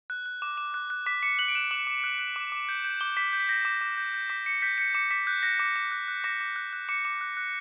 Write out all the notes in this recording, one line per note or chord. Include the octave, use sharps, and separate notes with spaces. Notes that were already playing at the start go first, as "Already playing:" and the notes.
F#6
F#6
D6
D6
F#6
F#6
D6 B6
D6 C#7
F#6 F#7
D7
F#6 E7
D6 F#7
D6
F#6
F#6
D6
D6
G6
G6
D6 G7
D6 B6
G6
B6
G6 A#6
D6
D6
G6
G6
D6 B6
D6 C#7
G6 B6
G6 C#7
D6 C#7
D6 B6
F#6 G6
F#6 A#6
D6
D6
F#6
F#6
D6 A#6
D6
F#6
F#6
D6 C#7
D6
F#6
F#6